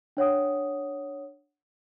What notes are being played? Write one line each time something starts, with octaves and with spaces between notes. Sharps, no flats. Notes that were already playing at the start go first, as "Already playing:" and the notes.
D4 C#5 F#5 D#6